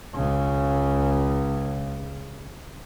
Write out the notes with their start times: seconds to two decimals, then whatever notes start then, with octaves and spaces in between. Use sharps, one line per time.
0.14 C#2 C#3